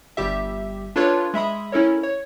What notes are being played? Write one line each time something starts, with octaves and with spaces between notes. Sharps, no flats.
G1 G3 G4 E5
D4 F4 A4 B4 C#5
G#3 E5 B5 D#6
C#4 E4 A4 A#4 C#5
C#5